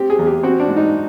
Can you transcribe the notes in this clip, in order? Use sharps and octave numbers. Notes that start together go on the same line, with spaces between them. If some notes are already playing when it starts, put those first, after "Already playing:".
Already playing: C4 G4
G#4
E2
G4
C4 F#4
D4
G#2
D#4